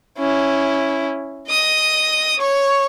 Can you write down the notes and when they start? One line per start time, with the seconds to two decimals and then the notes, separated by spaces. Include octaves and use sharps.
0.18 C#4 E4
1.49 D#5 D#6
2.40 C#5 C#6